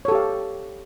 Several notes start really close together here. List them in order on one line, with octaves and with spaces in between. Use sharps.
C#5 A4 G4 F5